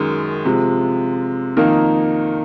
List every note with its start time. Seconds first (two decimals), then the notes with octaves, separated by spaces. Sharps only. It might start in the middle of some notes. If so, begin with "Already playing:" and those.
Already playing: F#2 D#3 G#3
0.45 C3 F3 G#3
1.57 F2 D#3 A#3 D#4 A#4